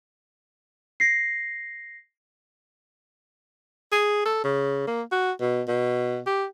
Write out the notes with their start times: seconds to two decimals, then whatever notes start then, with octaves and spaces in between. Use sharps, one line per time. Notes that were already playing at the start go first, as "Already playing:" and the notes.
1.00 A#6 C7
3.92 G#4
4.25 A4
4.44 C#3
4.87 A#3
5.12 F#4
5.40 B2
5.68 B2
6.26 G4